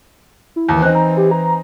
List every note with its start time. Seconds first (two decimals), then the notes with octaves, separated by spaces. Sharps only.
0.56 E4
0.69 D#2 E3
0.82 C4 D#4 F#6
0.95 A#5
1.17 G4
1.31 A#5